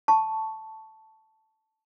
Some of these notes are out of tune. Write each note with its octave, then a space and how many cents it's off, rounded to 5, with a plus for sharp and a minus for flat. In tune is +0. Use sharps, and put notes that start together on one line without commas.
A5 +0 C#6 +0